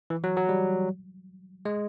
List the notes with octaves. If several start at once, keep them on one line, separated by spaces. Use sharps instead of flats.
E3
F#3
F#3
G3
G#3